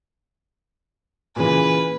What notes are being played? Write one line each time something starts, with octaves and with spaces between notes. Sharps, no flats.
A#2 C#3 E3 B4